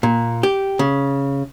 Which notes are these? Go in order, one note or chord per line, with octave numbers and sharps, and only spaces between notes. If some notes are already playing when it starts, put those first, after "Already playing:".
A#2
G4
C#3